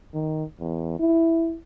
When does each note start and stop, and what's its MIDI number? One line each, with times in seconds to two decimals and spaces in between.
0.14 0.44 51
0.60 0.95 40
1.00 1.56 64